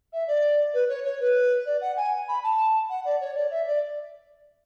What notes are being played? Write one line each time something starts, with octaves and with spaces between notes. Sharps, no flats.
E5
D5
B4
C#5
C#5
B4
D5
F#5
G#5
B5
A5
F#5
D5
C#5
D5
E5
D5